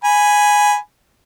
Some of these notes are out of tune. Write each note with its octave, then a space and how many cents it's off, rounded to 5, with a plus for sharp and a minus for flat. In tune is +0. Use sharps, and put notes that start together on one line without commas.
G#5 +0 B5 +0